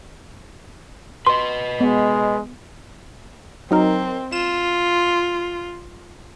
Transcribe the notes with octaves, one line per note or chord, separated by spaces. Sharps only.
B4 D#5 C6
G#3 B3
F#3 C4 D#4 A#4
F4 E7